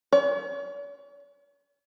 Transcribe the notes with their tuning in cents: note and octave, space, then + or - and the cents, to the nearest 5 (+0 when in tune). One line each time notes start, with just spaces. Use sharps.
C#5 +45